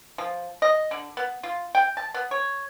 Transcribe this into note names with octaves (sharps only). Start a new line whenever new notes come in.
F3
D#5
D3
B3
F4
G5
A5
B3
C#5